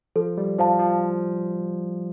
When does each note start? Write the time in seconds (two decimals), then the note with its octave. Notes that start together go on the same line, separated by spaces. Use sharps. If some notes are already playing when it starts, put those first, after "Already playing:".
0.16 F3 A4
0.37 G3
0.59 F3 C5 F5 A5
0.79 F3